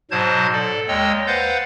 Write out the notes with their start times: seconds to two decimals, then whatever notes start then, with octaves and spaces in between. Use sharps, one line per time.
0.11 G#2 B2 F#3 C5 A5 G#6
0.53 A4 D5
0.88 D#2 G#3 C#5 D#5 G5 E6
1.27 B4 C5 F5 F#5 G6 A6